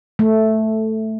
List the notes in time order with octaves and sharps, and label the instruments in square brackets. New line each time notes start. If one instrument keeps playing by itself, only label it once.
[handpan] A3